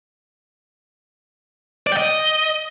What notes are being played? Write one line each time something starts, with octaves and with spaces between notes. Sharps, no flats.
D5
G5
D#5